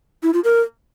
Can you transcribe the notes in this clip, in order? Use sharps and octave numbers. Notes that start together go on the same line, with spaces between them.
E4
F4
A#4